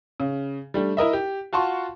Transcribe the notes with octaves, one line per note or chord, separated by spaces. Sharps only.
C#3
G3 A3 D4
E4 A#4 D#5 E5
G4
F4 F#4 A5 C6 C#6